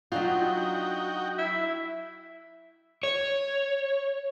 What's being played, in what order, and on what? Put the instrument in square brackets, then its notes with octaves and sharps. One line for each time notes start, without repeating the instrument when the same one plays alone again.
[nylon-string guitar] F#3 D4 F4 [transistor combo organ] D#4 F#4 G5
[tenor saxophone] E4
[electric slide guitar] C#5